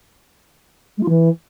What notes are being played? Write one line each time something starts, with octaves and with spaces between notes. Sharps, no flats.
G#3
F4
E3